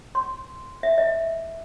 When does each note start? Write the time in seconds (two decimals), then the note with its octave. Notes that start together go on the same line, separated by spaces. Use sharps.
0.15 C6
0.83 E5
0.98 D#5